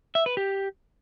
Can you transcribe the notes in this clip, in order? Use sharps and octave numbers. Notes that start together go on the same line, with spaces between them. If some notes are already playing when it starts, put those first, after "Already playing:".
E5
B4
G4